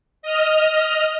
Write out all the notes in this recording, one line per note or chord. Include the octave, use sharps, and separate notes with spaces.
D#5 F6